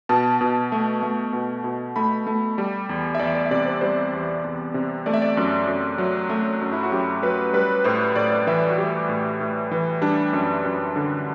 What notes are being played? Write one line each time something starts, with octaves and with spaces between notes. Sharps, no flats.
B2 A5
B2
A3
A3
B2
B2
A3 B5
A3
G3
E2
E5
E2 D5
D5
E5
C3 D5
C5
G3 C5
E2
E2
C3
A3 D5
E5
D5
F#2
F#2
F#3
A3
F#2
E4
F#4
F#2 G4
F#3 B4
G3 B4
A2 C5
A2 D5
D5
E3 E5
F#4
G3 G4
A2
A2
E3
G3 D4
F#2
F#2
D3